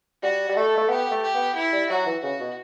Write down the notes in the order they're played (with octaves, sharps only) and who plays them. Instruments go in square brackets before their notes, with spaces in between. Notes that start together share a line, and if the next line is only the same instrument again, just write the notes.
[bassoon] G3 [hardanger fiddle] F#4
[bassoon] G3
[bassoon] A3 [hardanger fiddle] A4
[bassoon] A3
[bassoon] B3 [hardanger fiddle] G4
[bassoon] A3
[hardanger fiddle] G4
[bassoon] B3
[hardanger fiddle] E4
[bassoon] G3
[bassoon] F#3 [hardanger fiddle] F#4
[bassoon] E3
[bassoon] C#3 [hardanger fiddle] F#4
[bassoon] B2